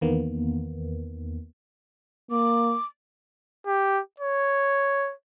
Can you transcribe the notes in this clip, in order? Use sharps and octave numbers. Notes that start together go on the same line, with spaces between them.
E2 D#3 A#3 B3
A#3 D6
G4
C#5